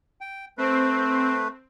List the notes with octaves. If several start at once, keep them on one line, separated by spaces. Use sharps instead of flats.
G5
A3 C4 B4